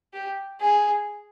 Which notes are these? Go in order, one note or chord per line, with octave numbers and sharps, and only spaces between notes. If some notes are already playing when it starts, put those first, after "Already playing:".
G4
G#4